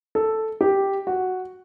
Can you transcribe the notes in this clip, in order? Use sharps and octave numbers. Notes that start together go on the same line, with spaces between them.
A4
G4
F#4